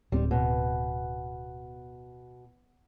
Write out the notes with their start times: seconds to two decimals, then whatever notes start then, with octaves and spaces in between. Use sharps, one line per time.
0.12 D1 G3 C4
0.31 B2